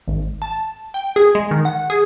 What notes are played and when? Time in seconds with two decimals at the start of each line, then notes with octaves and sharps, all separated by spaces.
0.07 G#1
0.42 A5
0.94 G5
1.16 G#4
1.35 G#3
1.51 D#3
1.65 F#5
1.90 G#4